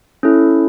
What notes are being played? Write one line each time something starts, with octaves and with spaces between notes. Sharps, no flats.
C#4 E4 A4